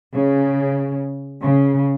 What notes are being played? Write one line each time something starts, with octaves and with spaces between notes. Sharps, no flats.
C#3
C#3